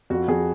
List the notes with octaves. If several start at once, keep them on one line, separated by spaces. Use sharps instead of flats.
F2 F#4
F2 G#4